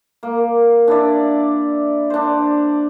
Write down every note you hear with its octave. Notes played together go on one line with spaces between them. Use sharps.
A#3
D4 E4 D5
D4 C5